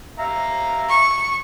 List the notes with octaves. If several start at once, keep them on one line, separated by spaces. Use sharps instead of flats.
E5 F5 A#5
C#6